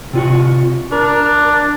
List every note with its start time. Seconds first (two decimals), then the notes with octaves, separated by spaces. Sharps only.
0.13 C3 F4 F#4
0.92 D4 A#4